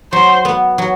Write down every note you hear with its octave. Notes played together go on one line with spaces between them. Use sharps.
F#3 C5
B3
F#3